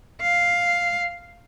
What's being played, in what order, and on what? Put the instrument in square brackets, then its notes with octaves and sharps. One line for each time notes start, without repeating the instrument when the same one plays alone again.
[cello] F5